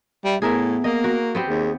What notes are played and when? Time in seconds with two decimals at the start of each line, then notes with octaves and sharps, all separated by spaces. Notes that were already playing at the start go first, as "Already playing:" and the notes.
0.24 G3 E5
0.42 A2 B3 G#4 A#4 E5
0.84 A#3 D#5
1.04 F#4 A#4
1.35 B3 C4 G4
1.48 D#2 G#4